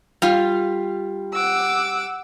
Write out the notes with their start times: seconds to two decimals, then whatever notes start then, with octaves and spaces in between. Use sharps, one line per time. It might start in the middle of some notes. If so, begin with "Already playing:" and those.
0.22 G3 F4
1.33 F#5 D6 E6